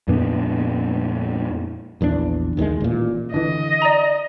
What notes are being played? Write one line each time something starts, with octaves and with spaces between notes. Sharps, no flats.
F2 A#2 B3 D4
A#1 E2 C#3 D4
D#2 D#3 F3 G#3
A1 A#2
D3 E3 D#5
D5 A#5